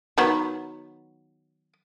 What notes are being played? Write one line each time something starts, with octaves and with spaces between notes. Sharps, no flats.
D#3 F#3 B3